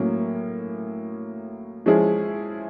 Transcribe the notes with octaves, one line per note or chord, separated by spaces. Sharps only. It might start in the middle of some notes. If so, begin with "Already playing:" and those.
Already playing: A2 F#3 A#3 C#4
F3 G#3 C#4 E4 G#4